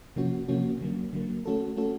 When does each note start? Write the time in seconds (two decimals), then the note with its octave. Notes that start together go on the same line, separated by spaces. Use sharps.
0.16 C3 F3 A#3 C#4 F#4
0.48 C3 F3 A#3 C#4 F#4
0.81 D3 F#3 A#3
1.13 D3 F#3 A#3
1.45 A3 C#4 F#4 A4
1.77 A3 C#4 F#4 A4